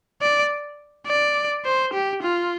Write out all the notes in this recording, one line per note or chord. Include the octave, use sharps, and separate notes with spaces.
D5
D5
C5
G4
F4